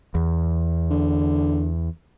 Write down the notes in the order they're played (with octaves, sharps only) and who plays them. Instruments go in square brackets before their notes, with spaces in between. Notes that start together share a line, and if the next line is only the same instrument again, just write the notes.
[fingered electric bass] E2
[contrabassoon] D3